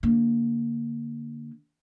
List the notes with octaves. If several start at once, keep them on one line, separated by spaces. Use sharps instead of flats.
D3 A#3